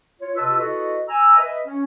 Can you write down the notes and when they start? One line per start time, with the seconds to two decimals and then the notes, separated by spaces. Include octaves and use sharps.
0.21 F4 C#5
0.36 C3 F4 B4 D#5 A5 E6
0.59 E4 F#4 A4 B4 D#5
1.09 G#5 A#5 E6
1.38 B4 D#5 E5
1.65 C#4